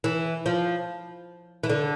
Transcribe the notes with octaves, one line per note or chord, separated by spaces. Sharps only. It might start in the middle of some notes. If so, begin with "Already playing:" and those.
E3
F3
E3
D3